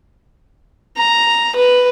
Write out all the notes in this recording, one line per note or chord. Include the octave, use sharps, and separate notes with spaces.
A#5
B4